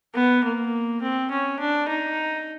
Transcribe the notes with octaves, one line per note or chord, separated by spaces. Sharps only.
B3
A#3
C4
C#4
D4
D#4